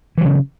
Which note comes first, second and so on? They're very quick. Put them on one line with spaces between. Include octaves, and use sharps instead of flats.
E3 F#3 C#3